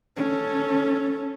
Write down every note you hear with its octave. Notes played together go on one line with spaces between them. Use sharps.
C#4 A4